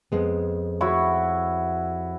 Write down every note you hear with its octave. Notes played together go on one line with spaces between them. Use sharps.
F2 G#3 B3
E4 F#4 C#5